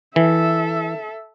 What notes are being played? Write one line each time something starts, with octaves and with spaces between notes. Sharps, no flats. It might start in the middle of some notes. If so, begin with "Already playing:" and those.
E3 A4 E5